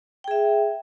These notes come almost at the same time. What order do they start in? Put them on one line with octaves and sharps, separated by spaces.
G5 G#4 E5